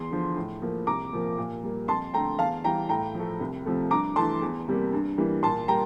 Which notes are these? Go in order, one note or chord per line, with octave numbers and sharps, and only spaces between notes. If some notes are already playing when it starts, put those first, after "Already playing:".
Already playing: E2 C6
D3 F3
A2
F3 A#3
C2 A#5 D6
A#2 F3 A#3
A#2
G3 A#3
F2 A5 C6
D3 A3 G5 A#5
E2 F5 A5
E3 G3 G5 A#5
A2 G5 A#5
F3 A3
C2
C3 F3 A3
G2 A#5 D6
E3 A3 A5 C6
E2
C3 G3 A#3
G2
E3 G3 A#3
A#2 A5 C6
G3 A#3 G5 A#5